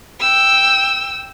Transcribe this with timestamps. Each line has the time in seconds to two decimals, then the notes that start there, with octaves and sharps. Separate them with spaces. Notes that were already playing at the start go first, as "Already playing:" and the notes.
0.19 G5 E6